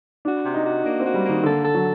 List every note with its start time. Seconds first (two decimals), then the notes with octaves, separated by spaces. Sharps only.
0.24 D4 F#4
0.44 C3
0.54 D#4
0.64 F#4
0.84 A#3 D4
1.00 C4 F#4
1.14 G3
1.24 D#3 A#3
1.43 D3 A4
1.63 A4
1.74 F#3